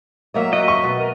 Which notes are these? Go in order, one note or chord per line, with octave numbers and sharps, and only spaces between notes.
F#3 A#3 D#5 E5
F#4 D#5
C#6
B2
A#4